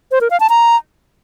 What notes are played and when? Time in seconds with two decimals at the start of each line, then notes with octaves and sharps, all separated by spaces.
0.11 C5
0.21 A#4
0.30 F5
0.40 A5
0.50 A#5